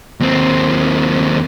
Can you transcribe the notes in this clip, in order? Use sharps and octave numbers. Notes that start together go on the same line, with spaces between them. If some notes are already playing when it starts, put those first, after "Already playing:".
D#2 C4